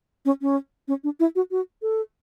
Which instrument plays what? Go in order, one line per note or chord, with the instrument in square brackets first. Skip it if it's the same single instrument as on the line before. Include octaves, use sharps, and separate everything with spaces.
[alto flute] C#4
C#4
C#4
D4
E4
F#4
F#4
A4